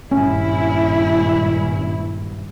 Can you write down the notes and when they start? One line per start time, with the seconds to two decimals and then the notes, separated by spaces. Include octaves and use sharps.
0.11 G#1 G2 A#2 C#4 E4